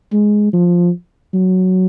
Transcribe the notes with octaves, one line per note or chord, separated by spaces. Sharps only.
G#3
F3
F#3